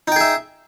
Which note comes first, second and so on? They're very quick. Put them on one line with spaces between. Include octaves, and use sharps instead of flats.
D#4 G5 G#4 E5